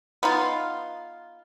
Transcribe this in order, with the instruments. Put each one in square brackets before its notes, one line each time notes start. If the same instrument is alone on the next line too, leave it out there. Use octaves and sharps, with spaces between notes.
[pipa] B3 D#4 F4